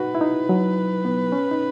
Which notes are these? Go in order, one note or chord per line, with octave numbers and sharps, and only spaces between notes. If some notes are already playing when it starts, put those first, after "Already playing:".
Already playing: D#4 F#4 B4
E4
D#4
F#3
B3
C#4
D#4